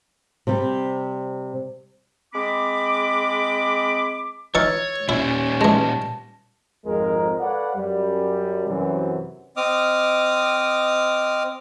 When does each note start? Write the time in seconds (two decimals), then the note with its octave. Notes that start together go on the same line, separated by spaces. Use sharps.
0.47 C3 G3
2.34 G#3 C4 B5 D6
4.55 E3 D#4 C#5 C#6 E6 F6 A6
5.09 A#2 G3 C#4 E4
5.61 E3 G#3 A5 A#6
6.85 G#1 F2 G#3 A#4
7.40 A4 B4 C#5 D5 F5 F#5
7.76 F#2 G3
8.68 F#2 C3 E3
9.57 C4 D#5 D6 D#6 F6